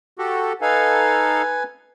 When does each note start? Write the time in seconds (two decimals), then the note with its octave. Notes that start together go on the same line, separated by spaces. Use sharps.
0.19 F#4 G4 A4
0.62 D#4 A4 B4 F5 G#5